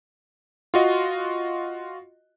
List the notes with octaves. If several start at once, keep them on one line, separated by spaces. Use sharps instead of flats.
F4 F#4 D#5